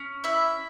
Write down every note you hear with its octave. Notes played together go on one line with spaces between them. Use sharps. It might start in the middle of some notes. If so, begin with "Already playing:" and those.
Already playing: C#4
E4 E5